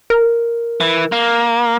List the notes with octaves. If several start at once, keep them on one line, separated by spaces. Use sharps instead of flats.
A#4
E3
A#3